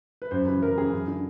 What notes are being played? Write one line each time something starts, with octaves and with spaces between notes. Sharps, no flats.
B4
F#2 C5
C#3 E3 B4
F#2 A#4
C#3 E3 G#4
F#2
D3